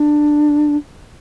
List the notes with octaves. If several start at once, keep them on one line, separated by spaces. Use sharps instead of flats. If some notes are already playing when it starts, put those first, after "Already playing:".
Already playing: D4